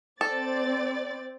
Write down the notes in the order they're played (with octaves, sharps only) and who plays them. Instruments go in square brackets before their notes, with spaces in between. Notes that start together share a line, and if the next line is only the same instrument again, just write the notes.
[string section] C4 D5 A6 [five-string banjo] A4